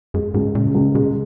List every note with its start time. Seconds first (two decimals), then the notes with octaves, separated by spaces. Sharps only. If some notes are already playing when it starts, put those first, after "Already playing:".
0.14 F#2 G#3
0.34 C#2 G#2
0.55 A#2 C#3
0.75 C#2
0.95 B2 G#3
1.05 C#3